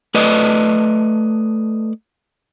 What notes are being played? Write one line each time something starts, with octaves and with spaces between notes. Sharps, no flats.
A3 B4 D5 D#5